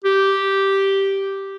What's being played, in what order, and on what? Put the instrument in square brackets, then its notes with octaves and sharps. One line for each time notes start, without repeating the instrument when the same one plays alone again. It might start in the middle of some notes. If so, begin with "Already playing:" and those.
[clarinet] G4